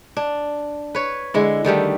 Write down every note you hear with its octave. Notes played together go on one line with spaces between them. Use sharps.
D4
B4 C#5
D3 G#3 E4
D3 D#3 G3 A3